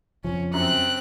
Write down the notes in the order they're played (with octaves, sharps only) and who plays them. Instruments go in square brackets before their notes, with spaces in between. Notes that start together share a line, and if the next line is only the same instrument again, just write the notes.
[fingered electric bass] F2 C#3 F3 [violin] C#4
[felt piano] F#2 [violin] C4 F#6